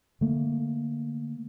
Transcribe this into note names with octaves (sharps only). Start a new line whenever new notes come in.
D3 A3 A#3